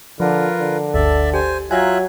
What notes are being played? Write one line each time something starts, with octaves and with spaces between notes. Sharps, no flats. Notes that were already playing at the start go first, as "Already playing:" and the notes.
D3 F3 F4 A#4 B4
D3
G1 D2 A4 D5 E5
G4 C5 G#5
F#3 F4 E5 G#5 A#5 F#6 G#6